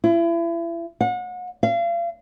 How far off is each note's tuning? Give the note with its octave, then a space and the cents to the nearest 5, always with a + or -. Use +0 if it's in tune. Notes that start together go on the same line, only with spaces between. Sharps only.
E4 +35
F#5 -35
F5 -35